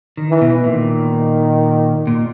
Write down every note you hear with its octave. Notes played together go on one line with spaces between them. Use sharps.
D#3
E3
B2
A#2 D#3
A#2